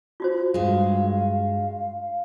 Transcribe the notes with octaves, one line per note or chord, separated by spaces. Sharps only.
F4 F#4 C5
G2 G#3 F5